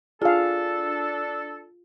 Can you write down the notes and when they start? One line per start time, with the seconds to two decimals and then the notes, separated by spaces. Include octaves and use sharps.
0.22 D4 F4 G#4 A4 F5